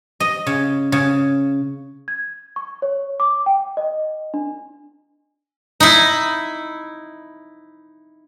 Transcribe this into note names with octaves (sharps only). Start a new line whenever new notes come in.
D#5
C#3
C#3
G#6
C#6
C#5
D6
G5
D#5
D4
D#4 E4